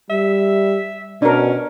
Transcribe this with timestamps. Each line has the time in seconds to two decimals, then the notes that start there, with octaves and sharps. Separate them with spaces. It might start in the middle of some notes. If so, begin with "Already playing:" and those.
0.10 G3 E5
1.22 B2 C#4 D4 A#4